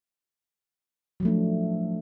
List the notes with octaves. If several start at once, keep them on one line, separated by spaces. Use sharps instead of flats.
F3 F#3 A3 D4